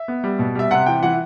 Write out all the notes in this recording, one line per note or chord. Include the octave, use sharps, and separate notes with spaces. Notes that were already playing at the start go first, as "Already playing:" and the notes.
Already playing: E5
B3
G3
B2
G3 E5
C3 F#5
E3 G5
E3 F#5